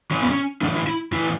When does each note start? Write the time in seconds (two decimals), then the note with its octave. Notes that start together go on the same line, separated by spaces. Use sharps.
0.11 A2 E3 C#4
0.22 B3
0.30 C#4
0.61 A2 E3 D4
0.75 E4
0.87 E4
1.12 A2 E3 E4